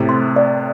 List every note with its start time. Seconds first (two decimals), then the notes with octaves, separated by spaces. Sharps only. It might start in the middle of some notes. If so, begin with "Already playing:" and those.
Already playing: A2 C3
0.09 C6
0.36 D5